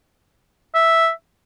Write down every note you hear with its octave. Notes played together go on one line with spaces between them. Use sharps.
E5